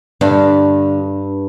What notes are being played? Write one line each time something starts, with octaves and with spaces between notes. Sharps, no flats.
G2 D3 G3 D4